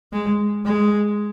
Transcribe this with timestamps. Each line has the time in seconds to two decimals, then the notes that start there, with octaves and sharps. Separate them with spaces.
0.12 G#3
0.65 G#3